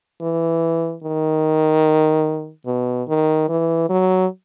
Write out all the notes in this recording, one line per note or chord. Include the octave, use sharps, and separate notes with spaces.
E3
D#3
B2
D#3
E3
F#3